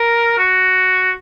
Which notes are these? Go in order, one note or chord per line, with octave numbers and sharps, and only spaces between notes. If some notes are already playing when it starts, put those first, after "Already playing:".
Already playing: A#4
F#4